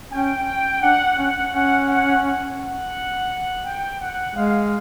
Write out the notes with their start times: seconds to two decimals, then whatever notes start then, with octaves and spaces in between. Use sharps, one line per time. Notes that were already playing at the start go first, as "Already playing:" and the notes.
0.12 C#4 G5
0.82 D4 F#5
1.18 C#4 F#5
1.53 C#4 F#5
1.89 F#5
2.60 F#5
3.65 G5
4.00 F#5
4.35 G#3 F5